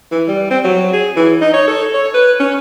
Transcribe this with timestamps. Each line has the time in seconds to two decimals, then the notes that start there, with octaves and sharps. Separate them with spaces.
0.11 E3
0.28 G3
0.50 C4
0.64 F#3
0.93 G#4
1.16 E3
1.41 D#4
1.54 C#5
1.68 A4
1.93 C#5
2.14 B4
2.40 C#4